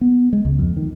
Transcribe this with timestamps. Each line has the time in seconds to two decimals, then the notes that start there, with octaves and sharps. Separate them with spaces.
0.01 B3
0.33 G#3
0.45 C#2
0.59 F2
0.77 D#3